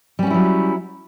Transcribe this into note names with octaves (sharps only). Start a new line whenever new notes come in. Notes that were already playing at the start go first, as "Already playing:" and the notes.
F#3 G3 C#4 E4 F#4